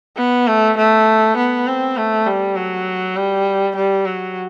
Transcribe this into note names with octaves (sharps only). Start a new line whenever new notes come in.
B3
A3
A3
B3
C4
A3
G3
F#3
G3
G3
F#3